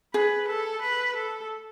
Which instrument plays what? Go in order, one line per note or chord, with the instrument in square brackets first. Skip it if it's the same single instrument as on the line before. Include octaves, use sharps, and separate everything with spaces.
[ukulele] G#4 [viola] B4
[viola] A4
B4
A4